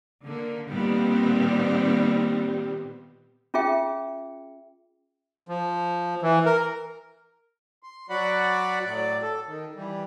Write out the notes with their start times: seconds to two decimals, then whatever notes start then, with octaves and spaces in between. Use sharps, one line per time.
0.24 D3 A#3
0.70 A#2 D#3 G3 B3 C4
3.54 C#4 F4 G#4 E5 G5
5.48 F3
6.22 E3
6.46 A#4
7.83 C6
8.10 F#3 F#4 D5 F#5 B5
8.85 A2 F#3 D5
9.22 A4
9.47 D#3
9.75 E3 G3